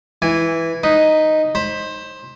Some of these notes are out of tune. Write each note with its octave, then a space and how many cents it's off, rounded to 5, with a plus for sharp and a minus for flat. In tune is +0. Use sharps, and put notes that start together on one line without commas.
E3 +0 G#5 -20
D#4 +0 B4 +0
C5 +15 B5 +0